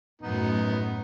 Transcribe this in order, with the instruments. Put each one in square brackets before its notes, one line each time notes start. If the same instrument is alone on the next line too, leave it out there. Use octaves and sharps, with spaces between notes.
[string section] F#2 A2 [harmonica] B3 D#4